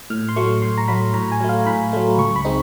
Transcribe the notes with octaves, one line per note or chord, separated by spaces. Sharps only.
A2 F6
C6
F#3 A3 C#6
A2 C6
A#5
F#3 A3 B5
A2 A#5
G#5
F#3 A3
F5
A2 B5
F#3 A3
C#2 C#6
B5
G#3 C4 D#4